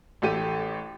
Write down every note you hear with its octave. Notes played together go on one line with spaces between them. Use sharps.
A1 A3 G4 D#7